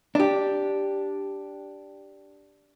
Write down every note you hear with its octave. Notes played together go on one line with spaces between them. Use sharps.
D4 G4